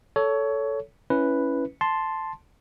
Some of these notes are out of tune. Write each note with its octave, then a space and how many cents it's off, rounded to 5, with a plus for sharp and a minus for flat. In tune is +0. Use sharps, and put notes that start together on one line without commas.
A4 +0 C#5 +20
C#4 +0 E4 +0 B4 +0
A5 +0 C6 +0